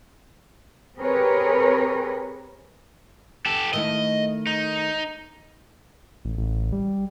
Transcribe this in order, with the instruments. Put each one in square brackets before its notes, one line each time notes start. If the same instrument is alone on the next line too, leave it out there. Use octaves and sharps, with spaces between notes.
[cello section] C4 G4 G#4 A#4 B4 C#5
[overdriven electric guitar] G4 A4
[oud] D#3 A3 E4 [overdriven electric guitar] D#5
[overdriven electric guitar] D#4
[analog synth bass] A1
A1
G3